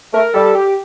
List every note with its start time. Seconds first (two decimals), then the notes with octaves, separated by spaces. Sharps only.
0.13 A3 A#4
0.34 G3 A4
0.55 G4